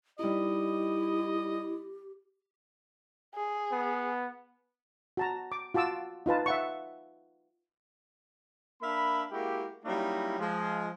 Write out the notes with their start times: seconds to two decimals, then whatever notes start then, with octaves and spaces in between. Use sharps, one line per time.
0.19 G3 D#4 E4 G4 D#5
3.35 G#4
3.72 B3
5.17 F#4 A5 A#5
5.52 D6
5.74 F4 F#4 A5 D6 E6
6.26 D#4 F4 B4 A5
6.46 E5 F#5 C#6
8.81 A#3 D4 E5 F5 B5
9.31 G#3 A#3 E4 F#4 G4
9.85 F#3 G3 A#3 C#4 D#4 E4
10.39 F3 G#3